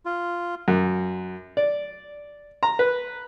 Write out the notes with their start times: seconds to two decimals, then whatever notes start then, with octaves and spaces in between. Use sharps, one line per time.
0.06 F4
0.68 F#2
1.57 D5
2.63 A#5
2.79 B4